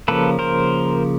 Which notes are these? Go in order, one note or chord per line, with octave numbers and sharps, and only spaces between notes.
C#3 F3 A#3 A4 B4
A#4 C5